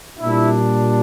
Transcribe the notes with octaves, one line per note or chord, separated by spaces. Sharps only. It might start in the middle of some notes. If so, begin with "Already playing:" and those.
A#2 G3 D4 E4